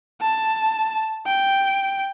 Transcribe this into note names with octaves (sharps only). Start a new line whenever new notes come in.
A5
G5